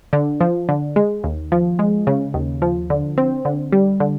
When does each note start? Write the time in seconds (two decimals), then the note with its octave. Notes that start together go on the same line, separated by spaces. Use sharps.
0.13 D3
0.41 F3
0.69 D3
0.96 G#3
1.24 D#2
1.52 F3
1.79 G#3
2.07 C#3
2.34 D#2
2.62 F3
2.90 D3
3.18 C4
3.45 D3
3.72 G3
4.00 D3